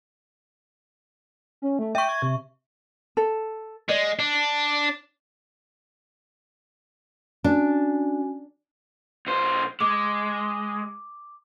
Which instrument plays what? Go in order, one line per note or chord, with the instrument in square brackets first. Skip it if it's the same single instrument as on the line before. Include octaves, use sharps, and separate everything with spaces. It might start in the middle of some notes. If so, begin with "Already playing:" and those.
[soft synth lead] C#4
A3
[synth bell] E5 C#6 [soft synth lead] G5
[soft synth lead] G#6
C3
[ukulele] A4
[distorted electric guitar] G#3 [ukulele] D5
[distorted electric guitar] D4
[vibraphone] C#4 F#4 G#5 [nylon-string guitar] D4
[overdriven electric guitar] B1 C5
[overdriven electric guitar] G#3 [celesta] D6